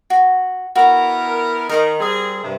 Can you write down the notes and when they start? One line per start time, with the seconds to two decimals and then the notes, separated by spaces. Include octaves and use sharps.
0.10 F#4
0.75 B3 E4 F#4 A#4
1.69 D#3 A#4 A#5 D#6
2.00 G3 C4 G#4
2.43 G2 C3